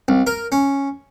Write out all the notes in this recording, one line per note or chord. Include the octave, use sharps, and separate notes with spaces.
C2
A#4
C#4